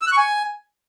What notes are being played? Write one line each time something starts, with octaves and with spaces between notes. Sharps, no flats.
E6
F#6
C#6
G#5